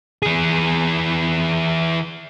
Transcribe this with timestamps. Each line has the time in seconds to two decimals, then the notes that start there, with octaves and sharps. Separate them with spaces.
0.23 E3 G#4